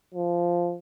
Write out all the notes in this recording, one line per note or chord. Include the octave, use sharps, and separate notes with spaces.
F3